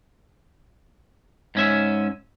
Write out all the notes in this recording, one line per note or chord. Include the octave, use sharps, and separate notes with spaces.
G#2 C#4 E5